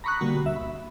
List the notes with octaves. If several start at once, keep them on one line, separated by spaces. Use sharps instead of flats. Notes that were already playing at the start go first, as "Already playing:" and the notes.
A#5 B5 C#6 D#6 F#6
B2 D3 G3 A#3 F#4
D2 E5
B5